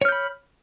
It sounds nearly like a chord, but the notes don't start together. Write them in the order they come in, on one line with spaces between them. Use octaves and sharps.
C#5 F6 G6 B5